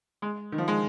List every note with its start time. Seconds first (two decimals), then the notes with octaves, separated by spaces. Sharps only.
0.22 G#3
0.52 D#3
0.58 F3
0.68 G#3